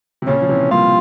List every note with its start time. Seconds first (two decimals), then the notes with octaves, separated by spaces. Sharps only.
0.22 C3
0.27 A#2 C#3 C#4
0.42 F3
0.49 C3 E3
0.70 G3 A#3 F4